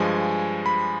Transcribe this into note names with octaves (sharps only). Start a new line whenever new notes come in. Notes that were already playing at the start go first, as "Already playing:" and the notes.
Already playing: G2 F3 G#3 G#5
B5